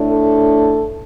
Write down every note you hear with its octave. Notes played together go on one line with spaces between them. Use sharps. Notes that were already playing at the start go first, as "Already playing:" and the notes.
Already playing: A2 A3 D4
A4